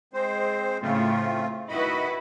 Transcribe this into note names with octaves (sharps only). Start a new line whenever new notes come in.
G#3 C4 C5
A2 C#3 A3 C4 F4
D#3 E4 F#4 B4 D#5 B5